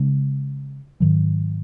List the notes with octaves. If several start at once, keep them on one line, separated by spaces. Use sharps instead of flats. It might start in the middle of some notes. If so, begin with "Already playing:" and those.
Already playing: C#3 G#3 C#4
G#2 D#3 F#3